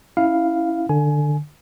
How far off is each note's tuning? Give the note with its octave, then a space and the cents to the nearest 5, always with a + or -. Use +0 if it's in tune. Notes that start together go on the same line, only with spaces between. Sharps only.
C#4 +0 E4 -5 F5 +0
D3 +15 G#5 +20